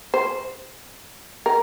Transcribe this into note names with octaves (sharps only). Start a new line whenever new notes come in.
C5
A#4